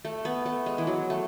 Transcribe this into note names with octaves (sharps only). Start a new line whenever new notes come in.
A3
B3
A3
G#3
E3
F#3
A3